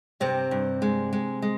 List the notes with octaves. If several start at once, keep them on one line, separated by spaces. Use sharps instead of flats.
G2 C3 C4
G2
G#3
G#3
G#3